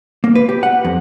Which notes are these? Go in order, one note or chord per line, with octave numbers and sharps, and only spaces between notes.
A#3
B4
G4
F#5
F2